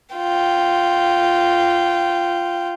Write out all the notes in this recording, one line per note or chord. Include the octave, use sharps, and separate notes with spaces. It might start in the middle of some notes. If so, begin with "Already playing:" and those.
F4 G5